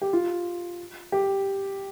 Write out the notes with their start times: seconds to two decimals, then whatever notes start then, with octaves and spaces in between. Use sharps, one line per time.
0.01 G4
0.13 F4
1.12 G4